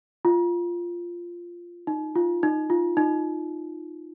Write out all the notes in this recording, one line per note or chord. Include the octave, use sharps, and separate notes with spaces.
F4
D#4
F4
D#4
F4
D#4